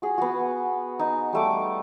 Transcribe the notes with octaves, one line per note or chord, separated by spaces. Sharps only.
F#4 G#4
B3 F#4
D#4
G3 A3 D6